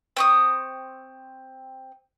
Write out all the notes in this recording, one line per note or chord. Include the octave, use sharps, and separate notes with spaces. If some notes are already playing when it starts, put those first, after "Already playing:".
C4 C#6 D#6